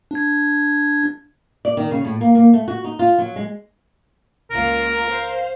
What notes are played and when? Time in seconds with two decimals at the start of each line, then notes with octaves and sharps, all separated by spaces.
0.11 D4 G#6
1.65 D5
1.77 D#3
1.91 C#3
2.05 A2
2.21 A#3
2.35 A#3
2.54 A3
2.68 F#4
2.84 D#4
2.99 F4
3.18 F#3
3.36 G#3
4.51 C#2 A#3 F4 A#4
5.06 C5 F5